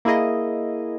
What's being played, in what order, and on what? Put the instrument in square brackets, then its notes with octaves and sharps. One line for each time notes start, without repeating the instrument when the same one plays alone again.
[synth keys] A#3 E4 G#4 D#5